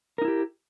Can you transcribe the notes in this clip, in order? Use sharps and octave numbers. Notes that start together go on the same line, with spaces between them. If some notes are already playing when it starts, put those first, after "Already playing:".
D#4 E4 G4 A#4